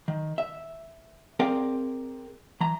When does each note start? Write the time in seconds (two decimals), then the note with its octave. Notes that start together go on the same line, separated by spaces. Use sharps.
0.08 D#3
0.38 E5
1.40 C4 G#4 A#4 D5 F5 G5
2.61 E3 A#5